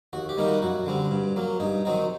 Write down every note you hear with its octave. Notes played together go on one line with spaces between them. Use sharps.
D#2 F#4
G4
D#3 G3 A#3 D#4
F#4
F#2 F#4
D3 G3 C4
G2
F#3 A#3
G2 D#4
D#3 F#3 C4 D#4